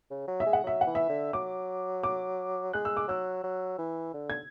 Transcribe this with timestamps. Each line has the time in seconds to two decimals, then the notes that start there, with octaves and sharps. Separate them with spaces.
0.10 C#3
0.28 F#3
0.40 E5
0.46 G#3
0.53 F#5
0.63 F#3 E5
0.81 F#5
0.87 E3
0.95 E5
1.09 D3
1.33 F#3 D6
2.03 D6
2.73 G#3 F#6
2.85 E6
2.97 D6
3.08 F#3 E6
3.43 F#3
3.78 E3
4.14 D3
4.30 G#6